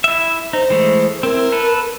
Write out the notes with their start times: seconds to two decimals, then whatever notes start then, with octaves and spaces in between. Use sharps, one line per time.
0.04 E4 E5
0.53 D#4 C5
0.70 E3 G#3 A3
1.23 C4 E4 A#4
1.52 A4 B4